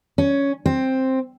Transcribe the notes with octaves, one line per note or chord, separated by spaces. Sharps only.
C#4
C4